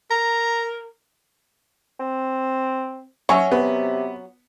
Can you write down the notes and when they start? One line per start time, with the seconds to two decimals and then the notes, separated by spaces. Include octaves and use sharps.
0.11 A#4 A#5
2.00 C4
3.29 F#3 C#4 C#5 E5
3.52 C3 B3